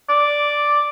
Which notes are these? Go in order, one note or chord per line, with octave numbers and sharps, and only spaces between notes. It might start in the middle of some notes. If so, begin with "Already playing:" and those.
D5